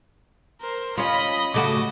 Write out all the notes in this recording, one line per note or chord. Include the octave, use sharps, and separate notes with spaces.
A#4 C5
C#4 F4 D#5 B5
C#3 A3 F#4 D#5 D6